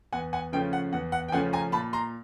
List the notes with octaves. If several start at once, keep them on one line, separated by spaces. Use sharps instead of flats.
E2 F#5 G#5
F#5 G#5
C#3 F3 A3 C#4 G5
F#5
E2 F#5
F#5
G5
C#3 F3 A3 C#4 F#5 G#5
G#5 A#5
A#2 A5 B5
A#5 C6